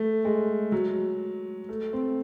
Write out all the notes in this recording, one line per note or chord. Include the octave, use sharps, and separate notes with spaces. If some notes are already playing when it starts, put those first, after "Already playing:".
Already playing: A3
G#3
F#3
A3
C4